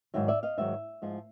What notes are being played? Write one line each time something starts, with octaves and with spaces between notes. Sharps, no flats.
G#2 D#3 F#3 E5
D5 E5
D#5 F5
G#2 D#3 F#3 E5
G#2 F3 G#3